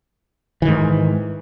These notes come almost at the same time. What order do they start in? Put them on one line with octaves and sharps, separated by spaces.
E3 D#3 G#2